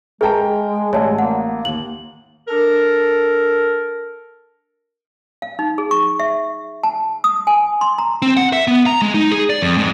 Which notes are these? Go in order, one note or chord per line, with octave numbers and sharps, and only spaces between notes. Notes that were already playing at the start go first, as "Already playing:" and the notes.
G#3 G#4 A#4 G5 A5 A#5
A1 G#3 C#5 D5 A5
A#3 F#5
D#2 F#7
D4 A4 A#4
F5
D#4
G#4
C#6
E5
A5
D#6
G#5
C6
A#5
C4
F#5
E5
B3
A#5
G#3
D#4
G#4
D5
F2
G#2